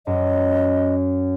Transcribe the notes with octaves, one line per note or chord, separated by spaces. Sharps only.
F#2 D#5